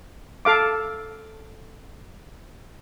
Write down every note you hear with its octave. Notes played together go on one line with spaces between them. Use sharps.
A4 F5 D6